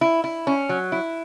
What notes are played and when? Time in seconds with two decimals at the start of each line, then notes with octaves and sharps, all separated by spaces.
0.01 E4
0.24 E4
0.47 C#4
0.69 F#3
0.92 E4